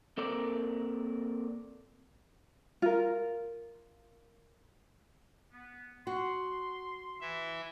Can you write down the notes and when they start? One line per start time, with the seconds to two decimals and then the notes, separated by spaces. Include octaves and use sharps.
0.17 A#3 C4 A4 A#4 D5
2.82 F4 A#4
5.52 B3
6.07 F#4 C6
7.21 E3 E5